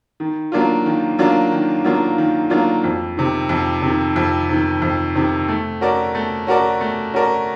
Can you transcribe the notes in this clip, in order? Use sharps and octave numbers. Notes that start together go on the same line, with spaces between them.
D#3
F#3 A#3 D4 F4
D#3
F#3 A#3 D4 F4
D#3
F#3 A#3 D4 F4
D#3
F#3 A#3 D4 F4
F2
C3 D#3
F2
C3 D#3
F2
C3 D#3
F2
C3 D#3
A3
C#4 F#4 A#4 D5
A3
C#4 F#4 A#4 D5
A3
C#4 F#4 A#4 D5